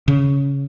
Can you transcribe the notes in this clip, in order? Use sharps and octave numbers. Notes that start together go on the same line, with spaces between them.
C#3